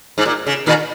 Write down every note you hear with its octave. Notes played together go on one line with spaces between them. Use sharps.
G#2
A#2
C#3
A#2 D#3